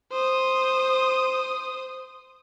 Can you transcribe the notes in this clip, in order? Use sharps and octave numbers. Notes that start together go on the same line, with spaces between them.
C5 D#6